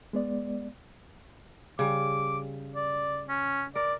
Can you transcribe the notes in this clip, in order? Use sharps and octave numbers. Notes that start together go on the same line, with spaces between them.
G#3 B3 D5
C#3 G3 D6
D5
C#4
A#4 D5